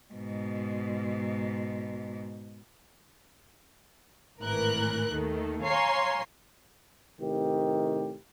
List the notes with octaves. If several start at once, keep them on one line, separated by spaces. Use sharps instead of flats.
G#2 B2
G#1 A2 E3 A#4 F#6
D#2 D#3 A3
C#5 F5 G#5 A#5 C6
A2 C3 D#3 G4